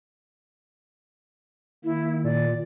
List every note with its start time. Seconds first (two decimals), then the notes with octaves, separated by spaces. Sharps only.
1.84 D#3 A#3 E4
2.24 A#2 D5